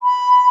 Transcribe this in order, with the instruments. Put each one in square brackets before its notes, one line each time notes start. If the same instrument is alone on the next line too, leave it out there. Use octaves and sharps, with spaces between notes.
[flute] B5